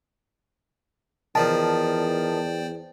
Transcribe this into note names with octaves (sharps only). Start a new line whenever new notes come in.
E2 D#3 F3 C5 D5 G5 A5